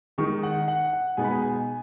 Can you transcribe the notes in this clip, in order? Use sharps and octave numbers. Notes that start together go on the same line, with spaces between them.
D#3 G#3 D#4 C#6
F#5
F#5
F#5
B2 G#3 B3 D#4 G#5
B5
G#5
G#5